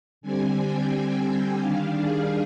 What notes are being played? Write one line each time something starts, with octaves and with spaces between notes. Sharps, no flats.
D3 G3 C4 G#5
G5
G#5
G5
D#3 G3 D4 F5
G#4